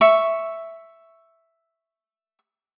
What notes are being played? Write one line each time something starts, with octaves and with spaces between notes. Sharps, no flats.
E5 C#6